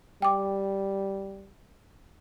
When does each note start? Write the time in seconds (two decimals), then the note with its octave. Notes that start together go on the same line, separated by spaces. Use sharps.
0.22 G3 G5 D6